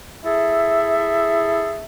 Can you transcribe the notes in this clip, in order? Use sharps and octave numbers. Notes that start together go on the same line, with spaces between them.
E4 G#4 A4 E5